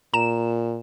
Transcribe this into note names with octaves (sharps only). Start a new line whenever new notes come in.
A#2 A#5 E7